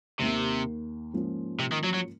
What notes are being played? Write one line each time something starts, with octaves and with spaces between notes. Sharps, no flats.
D#2 C3 D#3 A#3
G#2 F3 A#3 C#4 F4
C3
D#3
F#3
F#3